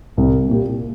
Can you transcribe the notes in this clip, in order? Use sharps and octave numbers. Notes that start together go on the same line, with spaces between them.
C2
A#2 A#3 G4